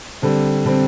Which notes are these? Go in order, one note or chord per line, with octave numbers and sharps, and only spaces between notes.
D3 G3 C4
D3 G3 C4